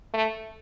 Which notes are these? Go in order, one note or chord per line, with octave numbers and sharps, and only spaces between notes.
A3